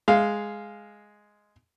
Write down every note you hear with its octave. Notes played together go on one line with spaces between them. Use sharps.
G#3 F5